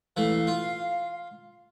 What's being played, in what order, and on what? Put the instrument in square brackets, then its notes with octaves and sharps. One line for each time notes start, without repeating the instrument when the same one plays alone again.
[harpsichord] E3 A3 [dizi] F5
[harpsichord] F4